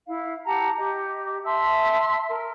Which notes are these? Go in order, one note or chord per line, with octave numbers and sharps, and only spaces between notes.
E4 F5
G4 F#5 A5 A#5
G4 D#5
E5 A5 C6 E6
A#4